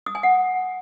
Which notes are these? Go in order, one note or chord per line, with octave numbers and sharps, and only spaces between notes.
D#6
G#5
F#5